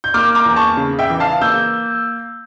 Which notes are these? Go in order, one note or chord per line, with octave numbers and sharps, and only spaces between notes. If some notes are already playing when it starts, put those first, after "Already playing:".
G6
A#3 D6 F6
A#5 D6
E2
A5 C#6
C#3
E5 G5
E3
F5 A5
A#3 E6 G6